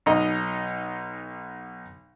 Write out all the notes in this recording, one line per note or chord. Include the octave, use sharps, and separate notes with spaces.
B1 D#4 D#5